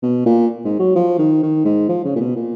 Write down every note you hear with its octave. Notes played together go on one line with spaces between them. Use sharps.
B2
A#2
G#2
F#3
F3
D#3
D#3
G#2
F3
C#3
A#2
B2
A#2